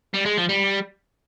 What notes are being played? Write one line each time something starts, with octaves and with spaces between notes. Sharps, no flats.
G3
G#3
F3
G3